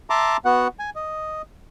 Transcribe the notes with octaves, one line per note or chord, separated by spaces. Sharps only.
E5 A5 A#5 C6 D6
B3 F#4 F#5
G#5
D#5